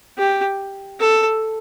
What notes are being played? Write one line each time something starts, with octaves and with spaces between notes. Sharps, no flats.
G4
A4